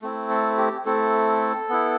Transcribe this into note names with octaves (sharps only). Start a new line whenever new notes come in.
A3 C4 E4
A4
G4
A3 C4 E4 A4
B3 E4